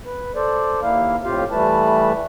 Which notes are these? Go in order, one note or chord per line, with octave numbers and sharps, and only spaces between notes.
B4
A4 C5 D5
D#2 A#3 E4 F5
F2 A2 C4 F4 G4 F5
E3 G3 A3 B4 A5